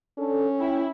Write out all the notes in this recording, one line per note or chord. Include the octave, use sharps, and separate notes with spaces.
C#4 D4 A4
E4 G5